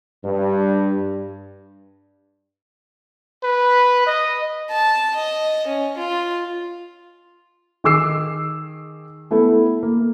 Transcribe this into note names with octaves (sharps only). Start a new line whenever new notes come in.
G2
B4
D#5
A5
D#5
C#4
F4
D#3 G#4 D6 E6 C7
A3 B3 E4 A4
A#3